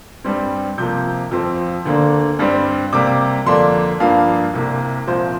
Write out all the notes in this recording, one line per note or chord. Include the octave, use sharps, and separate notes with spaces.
G2 G3 C4
C3 F3 A#3 G6
F2 F3 C4
D2 D3 A#3 D4
G2 G3 C4
C3 G3 A#3 D6
F2 D3 A#3 D4 C6
G2 F3 A#3 D4 F5
C2 C3 A#3
C2 A#2 F3 C5